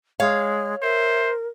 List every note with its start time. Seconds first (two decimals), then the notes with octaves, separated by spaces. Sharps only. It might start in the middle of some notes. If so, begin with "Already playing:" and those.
0.20 G#3 C#5 F5
0.82 A#4 C5 E5